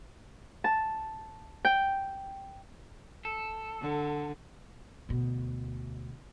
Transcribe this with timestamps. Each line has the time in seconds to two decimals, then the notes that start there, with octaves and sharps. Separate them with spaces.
0.64 A5
1.65 G5
3.25 A4
3.81 D3
5.09 D2 B2